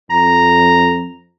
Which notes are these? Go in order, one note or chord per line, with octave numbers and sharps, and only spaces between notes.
F2 A#5